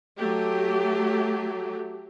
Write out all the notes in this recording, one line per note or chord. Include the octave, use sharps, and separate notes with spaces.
F#3 A3 G4